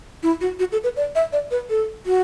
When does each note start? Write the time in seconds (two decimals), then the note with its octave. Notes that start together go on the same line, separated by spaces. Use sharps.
0.23 E4
0.41 F#4
0.59 F#4
0.72 A4
0.84 B4
0.96 D5
1.15 E5
1.33 D5
1.51 B4
1.70 A4
2.06 F#4